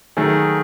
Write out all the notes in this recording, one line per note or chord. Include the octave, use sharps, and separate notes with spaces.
D#3 F#3 A3 G#4